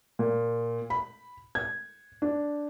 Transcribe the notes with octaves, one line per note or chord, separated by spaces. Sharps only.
A#2
B5
G#6
D4